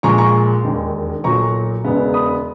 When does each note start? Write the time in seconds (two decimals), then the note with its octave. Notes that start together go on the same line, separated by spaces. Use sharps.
0.03 A#1 A#2 G#3 A#5 C#6
0.18 A#5 C#6
0.64 E1 D#2 D#3 G#3
1.24 B1 A#2 F#3 A#5 C#6
1.84 E1 E2 C#3 G#3 B3
2.14 B5 D#6